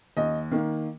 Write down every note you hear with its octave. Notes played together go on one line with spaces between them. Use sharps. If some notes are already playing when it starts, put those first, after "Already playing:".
D#2 D#5
D#3 A#3